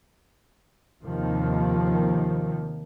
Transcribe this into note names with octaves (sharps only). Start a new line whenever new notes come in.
D#2 C3 D#3 F3